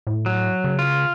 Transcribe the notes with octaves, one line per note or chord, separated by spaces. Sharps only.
A2
F#3
C#3
F4